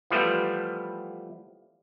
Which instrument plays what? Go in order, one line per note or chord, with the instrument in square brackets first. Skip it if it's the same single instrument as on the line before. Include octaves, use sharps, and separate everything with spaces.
[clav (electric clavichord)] E3 F3 G3 A3 B3